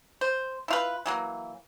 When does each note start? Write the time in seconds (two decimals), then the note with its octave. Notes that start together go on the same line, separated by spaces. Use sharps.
0.21 C5
0.68 E4 F4 B4
1.06 E3 F#3 A#3